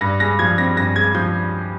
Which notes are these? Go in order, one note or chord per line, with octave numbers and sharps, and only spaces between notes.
G2 A#6
G#3 A#6
F3 G#6
C4 A#6
G2 A#6
G#3 G#6
F3 G6